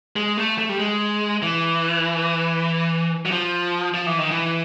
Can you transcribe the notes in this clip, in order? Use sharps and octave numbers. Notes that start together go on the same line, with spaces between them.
G#3
A3
A3
G3
G#3
E3
F#3
F3
F3
E3
D#3
E3